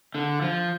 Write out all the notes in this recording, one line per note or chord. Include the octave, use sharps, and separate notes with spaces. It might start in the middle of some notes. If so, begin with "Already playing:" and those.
D3
F3